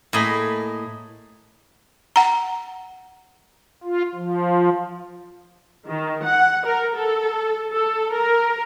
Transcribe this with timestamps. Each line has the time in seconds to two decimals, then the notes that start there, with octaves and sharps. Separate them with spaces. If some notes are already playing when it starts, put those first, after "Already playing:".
0.13 A2 A#3 G#4 D#5 B5
2.16 F#5 A#5
3.84 F4
4.15 F3
5.88 D#3
6.24 F#5
6.65 A#4
6.95 A4
7.71 A4
8.13 A#4